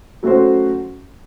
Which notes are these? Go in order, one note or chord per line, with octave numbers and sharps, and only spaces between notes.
F#3 A3 C#4 F#4 C5